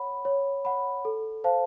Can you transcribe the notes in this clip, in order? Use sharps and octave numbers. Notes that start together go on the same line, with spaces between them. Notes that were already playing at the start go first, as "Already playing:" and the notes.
Already playing: C#5 F#5 B5
C#5
F#5 B5
A4
C5 F5 A5